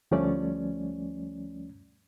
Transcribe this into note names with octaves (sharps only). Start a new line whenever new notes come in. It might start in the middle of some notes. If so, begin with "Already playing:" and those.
D2 F3 G3 A3 C#4 D5